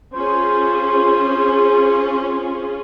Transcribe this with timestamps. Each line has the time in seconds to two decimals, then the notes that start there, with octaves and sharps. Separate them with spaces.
0.14 C#4 F4 G#4 C5